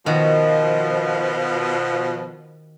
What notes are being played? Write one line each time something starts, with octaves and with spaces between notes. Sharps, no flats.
B2 D#3 F3 F#4